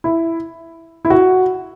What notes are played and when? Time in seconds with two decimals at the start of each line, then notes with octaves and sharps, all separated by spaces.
0.04 E4
1.05 E4
1.10 F#4